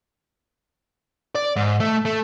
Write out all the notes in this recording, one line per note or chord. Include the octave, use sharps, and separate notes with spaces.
D5
G#2
A3
A3